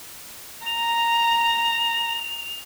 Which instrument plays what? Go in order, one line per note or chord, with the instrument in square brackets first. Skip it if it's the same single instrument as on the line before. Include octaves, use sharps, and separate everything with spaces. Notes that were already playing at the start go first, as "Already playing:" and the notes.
[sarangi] A#5 [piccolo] F7